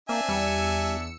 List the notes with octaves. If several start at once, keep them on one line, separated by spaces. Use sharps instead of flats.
A#3 C4 D4 E5 G#5
E2 G3 E6 C#7